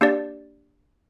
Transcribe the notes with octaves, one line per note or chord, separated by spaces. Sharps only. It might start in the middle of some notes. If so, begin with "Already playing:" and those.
A#3 D4 G4 D5